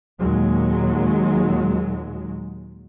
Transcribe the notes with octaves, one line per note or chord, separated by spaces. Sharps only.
D#2 A#2 F#3 G#3